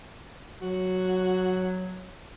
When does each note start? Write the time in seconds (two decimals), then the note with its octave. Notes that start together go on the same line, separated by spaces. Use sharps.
0.61 F#3 F#4